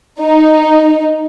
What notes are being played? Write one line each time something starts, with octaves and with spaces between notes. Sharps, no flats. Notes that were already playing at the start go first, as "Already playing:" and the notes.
D#4